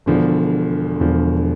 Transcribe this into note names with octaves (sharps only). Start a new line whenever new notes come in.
E1 E2 D3 F3
E1 E2 D3 F3